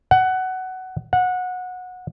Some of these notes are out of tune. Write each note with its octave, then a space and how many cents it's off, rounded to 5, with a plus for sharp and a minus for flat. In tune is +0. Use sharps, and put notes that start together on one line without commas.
F#5 +15
F#5 -20